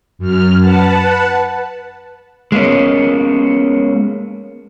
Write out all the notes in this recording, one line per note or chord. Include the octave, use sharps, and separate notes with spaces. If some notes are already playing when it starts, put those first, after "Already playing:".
F#2 F6
B4 F#5 A5
G#3 A#3 B3 C#4